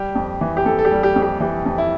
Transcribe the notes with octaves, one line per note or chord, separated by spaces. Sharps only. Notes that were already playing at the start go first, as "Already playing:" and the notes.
Already playing: G3 G4
F2
E3
G4
F2 A4
A4
G4
G3
G4
F2
G4
E3 G4
F2
E4